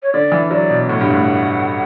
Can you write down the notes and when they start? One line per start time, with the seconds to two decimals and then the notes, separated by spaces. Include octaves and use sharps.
0.03 C#5
0.13 D3 D5
0.32 E3
0.51 F#3 D5
0.69 B2
0.89 A2 F#5
1.01 G2
1.13 A2